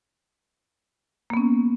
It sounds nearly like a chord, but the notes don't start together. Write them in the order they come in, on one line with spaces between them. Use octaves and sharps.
A#3 B3 C#4